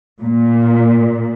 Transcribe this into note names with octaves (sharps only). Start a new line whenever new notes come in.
A#2